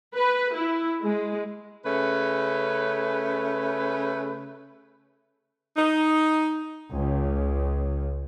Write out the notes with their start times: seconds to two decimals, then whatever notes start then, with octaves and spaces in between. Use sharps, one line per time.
0.16 B4
0.54 E4
1.04 G#3
1.85 C#3 A3 C#4 B4
5.77 D#4
6.91 C#2